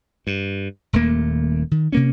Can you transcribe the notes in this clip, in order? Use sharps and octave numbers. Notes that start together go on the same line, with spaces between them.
G2
D#1 D#2 A3 A#3
D#3
C3 A#3 C#4